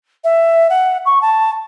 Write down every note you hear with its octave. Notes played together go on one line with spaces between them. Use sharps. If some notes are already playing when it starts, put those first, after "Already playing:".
E5
F#5
C#6
A5